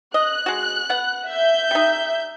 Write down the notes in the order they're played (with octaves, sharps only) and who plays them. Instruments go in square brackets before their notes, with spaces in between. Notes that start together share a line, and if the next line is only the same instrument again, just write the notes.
[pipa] D#5 [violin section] F#6
[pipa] G#3 F#4
B3 F#5
[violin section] E5 G6
[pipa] G3 D#4